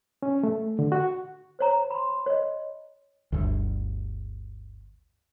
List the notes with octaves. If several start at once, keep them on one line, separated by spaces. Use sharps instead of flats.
C#4
A3
D3
F#4
C5 C#5 A#5
B5 C6
C#5 D#5
G1 D2